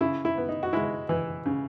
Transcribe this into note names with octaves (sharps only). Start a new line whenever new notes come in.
C#3 E4
E4
B3
D#4
F#4
G#3 E4
E3
C#3